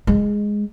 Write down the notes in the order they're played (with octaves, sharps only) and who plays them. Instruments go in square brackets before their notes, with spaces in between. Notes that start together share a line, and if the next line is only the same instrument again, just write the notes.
[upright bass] G#3